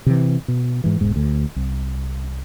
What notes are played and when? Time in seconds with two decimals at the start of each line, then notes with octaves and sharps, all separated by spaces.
0.06 C3 E3
0.48 B2
0.84 G#2 E3
1.01 E1 G#2
1.16 D2
1.56 C2